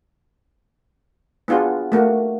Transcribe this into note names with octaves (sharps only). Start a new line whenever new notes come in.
B3 D4 F4 F#4 G#4
A3 A#3 F#4